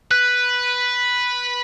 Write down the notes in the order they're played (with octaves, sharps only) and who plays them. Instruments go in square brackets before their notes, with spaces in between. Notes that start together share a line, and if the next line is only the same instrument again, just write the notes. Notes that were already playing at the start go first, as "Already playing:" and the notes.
[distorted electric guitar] B4 [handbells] F#6